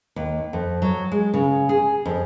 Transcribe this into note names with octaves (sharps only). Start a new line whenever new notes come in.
D#2
F2
F#3
G#3
C#3
G#4
F2